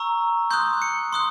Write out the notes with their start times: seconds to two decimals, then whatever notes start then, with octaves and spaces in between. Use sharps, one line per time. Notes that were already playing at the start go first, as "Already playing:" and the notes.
Already playing: A#5 C#6 E6
0.51 C6 D#6 F#6 G6
0.82 C#7
1.13 C6 D#6 F#6